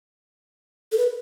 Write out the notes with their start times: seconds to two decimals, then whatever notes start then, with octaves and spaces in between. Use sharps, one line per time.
0.92 A4
0.98 B4